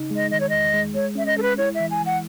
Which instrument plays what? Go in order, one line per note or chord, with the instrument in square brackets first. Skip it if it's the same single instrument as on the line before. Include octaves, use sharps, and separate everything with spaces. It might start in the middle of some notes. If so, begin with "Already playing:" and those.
Already playing: [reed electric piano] C#3 D#4
[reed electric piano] G#3 [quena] D#5
[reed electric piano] D#3 [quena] D#5
[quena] C#5
[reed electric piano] E2 [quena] D#5
[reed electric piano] G#3
[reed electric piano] G#3 [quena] C#5
[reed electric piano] C#4 [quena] E5
[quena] D#5
[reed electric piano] G#3 [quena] A4
[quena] B4
[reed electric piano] E4 [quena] C#5
[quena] E5
[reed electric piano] E3
[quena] G#5
[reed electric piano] E3 [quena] F#5